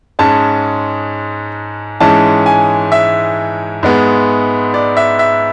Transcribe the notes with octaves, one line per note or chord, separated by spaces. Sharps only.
G#2 G#3 C#4 A5
G#2 E3 G#3 C#4 A5
G#5
E5
G#2 G#3 B3
D5
E5
E5